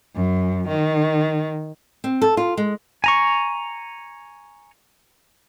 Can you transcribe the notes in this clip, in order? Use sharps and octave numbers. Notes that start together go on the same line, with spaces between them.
F#2
D#3
C4
A4
F4
G#3
G#5 A#5 C#6